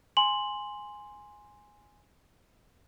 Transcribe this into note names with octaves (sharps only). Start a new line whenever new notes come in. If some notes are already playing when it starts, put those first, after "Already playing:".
G#5 C6 F#7